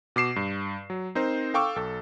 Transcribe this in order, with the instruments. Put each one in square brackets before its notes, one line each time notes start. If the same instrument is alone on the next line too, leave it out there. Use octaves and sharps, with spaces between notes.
[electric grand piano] B2 D6 C7 E7
G2
F#3
C4 D#4 A#4 C5
A4 F5 G5 C#6 D6 E6
B1 A4